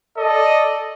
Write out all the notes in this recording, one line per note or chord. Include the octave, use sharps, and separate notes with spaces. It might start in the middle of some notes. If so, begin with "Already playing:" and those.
A4 D5 D#5